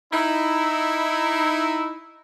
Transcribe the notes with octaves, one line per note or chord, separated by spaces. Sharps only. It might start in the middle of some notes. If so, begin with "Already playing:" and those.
D#4 E4